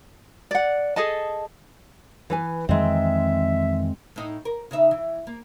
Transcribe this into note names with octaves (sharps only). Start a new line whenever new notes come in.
D5 F#5
G#4 A4 D#5 A5
E3 B4 G#5
F2 D#3 E3 G#3 C4 E5
A2 D#4
A#4
C#3 D#4 E5
E3
A#3